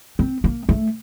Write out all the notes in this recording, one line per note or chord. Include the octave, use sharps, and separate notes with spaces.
C4
A#3
A3